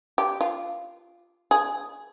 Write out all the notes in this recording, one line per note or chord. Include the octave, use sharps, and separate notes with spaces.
G4
F4
G#4